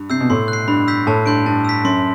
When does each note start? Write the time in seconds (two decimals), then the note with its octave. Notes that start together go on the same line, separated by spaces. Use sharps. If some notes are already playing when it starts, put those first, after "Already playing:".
Already playing: G2
0.10 C3 E6 G6 C7
0.20 B2
0.30 A2 C6
0.48 F#6
0.53 C7
0.67 G2 B5
0.88 E6 G6 B6
1.06 A2 A5
1.26 G2 C6 G6 D7
1.46 G2 A5
1.65 E6 B6
1.84 F#2 C6